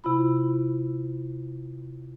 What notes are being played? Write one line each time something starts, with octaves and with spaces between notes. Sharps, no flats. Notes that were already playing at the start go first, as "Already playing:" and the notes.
C3 E4 F4 B5